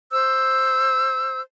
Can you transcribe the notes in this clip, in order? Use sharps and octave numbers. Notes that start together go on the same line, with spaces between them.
C5 E6 G6